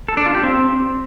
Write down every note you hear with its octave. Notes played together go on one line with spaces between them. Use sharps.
A4
D4
F4
G4
C4